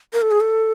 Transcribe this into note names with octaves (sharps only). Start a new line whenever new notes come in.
A#4
A4
G#4
A4